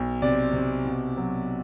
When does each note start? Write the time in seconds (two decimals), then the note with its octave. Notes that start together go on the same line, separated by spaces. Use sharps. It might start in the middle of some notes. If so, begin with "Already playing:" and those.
Already playing: B1
0.22 C3 D5
0.53 C3
0.85 B2
1.17 F#3